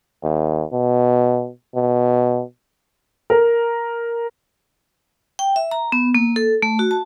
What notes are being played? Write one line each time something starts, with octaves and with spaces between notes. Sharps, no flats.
D#2
B2
B2
A#4
G5
E5
A#5
B3
A#3
A4
A3
F#4
A5